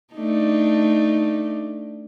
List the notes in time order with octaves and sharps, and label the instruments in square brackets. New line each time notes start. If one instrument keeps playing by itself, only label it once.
[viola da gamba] A3 D4 D#4